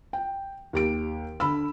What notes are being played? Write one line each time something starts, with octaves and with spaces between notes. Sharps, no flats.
G5
D#2 G4 D7
D3 B5 E6